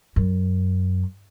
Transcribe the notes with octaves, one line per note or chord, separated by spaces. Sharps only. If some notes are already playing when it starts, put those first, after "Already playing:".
F#2